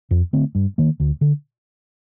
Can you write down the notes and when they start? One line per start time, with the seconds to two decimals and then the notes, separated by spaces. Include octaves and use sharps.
0.11 F2
0.33 D3 A3 C4
0.55 G2
0.78 D#3 A#3
1.00 D2
1.21 D3